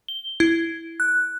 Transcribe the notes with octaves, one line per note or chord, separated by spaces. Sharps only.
G7
E4
F#6